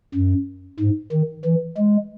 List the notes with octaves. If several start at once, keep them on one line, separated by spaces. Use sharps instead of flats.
F#2
G#2
D#3
E3
G#3